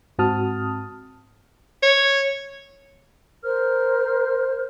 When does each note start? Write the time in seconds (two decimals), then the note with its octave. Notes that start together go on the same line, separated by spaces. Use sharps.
0.18 G#2 C4 F#4 A5 D#6 F6
1.83 C#5
3.43 A#4 C5 F6